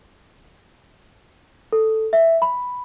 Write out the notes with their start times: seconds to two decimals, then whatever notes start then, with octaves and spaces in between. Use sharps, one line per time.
1.73 A4
2.13 E5
2.42 B5